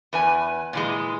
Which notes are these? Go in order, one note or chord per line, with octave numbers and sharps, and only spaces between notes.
E2 B4 G#5
A#2 E3 G#3